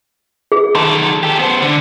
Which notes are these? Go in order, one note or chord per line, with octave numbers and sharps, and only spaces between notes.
G#4
D#3 A4 C6
G4 A4
B3 C5
D3